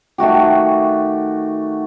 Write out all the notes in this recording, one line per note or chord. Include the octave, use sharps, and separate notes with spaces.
D#3 A3 F#4 G4